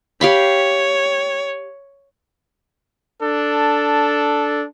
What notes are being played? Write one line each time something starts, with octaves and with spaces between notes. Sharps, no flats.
G4 C#5 F5 B5
D4 A4